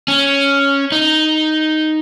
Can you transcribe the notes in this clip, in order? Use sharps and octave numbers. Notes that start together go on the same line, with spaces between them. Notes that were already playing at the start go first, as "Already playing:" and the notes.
C#4
D#4